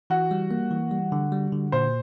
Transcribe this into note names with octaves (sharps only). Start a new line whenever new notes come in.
E3 F#4
G3
A#3
E3
G3
D3
G3
D3
A#2 C5